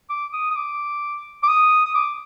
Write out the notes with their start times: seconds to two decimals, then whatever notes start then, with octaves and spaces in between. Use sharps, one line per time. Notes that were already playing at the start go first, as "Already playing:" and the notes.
0.10 D6
0.33 D#6
0.51 D#6
0.56 D6
1.43 D6
1.49 D#6
1.86 D#6
1.95 D6